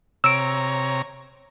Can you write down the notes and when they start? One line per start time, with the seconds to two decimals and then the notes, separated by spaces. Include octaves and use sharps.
0.24 C3 C#5 A#5 E6 D7